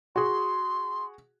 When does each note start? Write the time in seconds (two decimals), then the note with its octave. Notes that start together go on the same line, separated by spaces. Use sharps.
0.16 F#4 G#4 C6